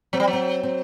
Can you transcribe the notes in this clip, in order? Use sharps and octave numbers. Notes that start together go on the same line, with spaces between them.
F#3 C4
G3
F#3
C4
C4